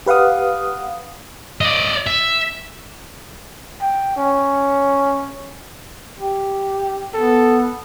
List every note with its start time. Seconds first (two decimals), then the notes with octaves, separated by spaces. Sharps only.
0.06 G4 B4 F5 F#5 D#6
1.61 D5 D#5
2.06 E5
3.82 G5
4.17 C#4
6.19 G4
7.14 B3 A4